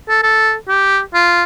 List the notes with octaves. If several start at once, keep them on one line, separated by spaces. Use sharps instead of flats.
A4
A4
G4
F4